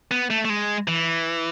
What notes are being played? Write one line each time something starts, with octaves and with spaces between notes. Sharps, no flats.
B3
A3
A3
G#3
E3